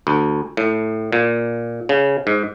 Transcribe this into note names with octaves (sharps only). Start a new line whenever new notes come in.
D2
A2
A#2
C#3
G#2